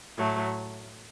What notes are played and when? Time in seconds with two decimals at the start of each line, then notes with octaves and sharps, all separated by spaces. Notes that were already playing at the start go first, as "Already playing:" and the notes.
0.16 A2 F#3 A3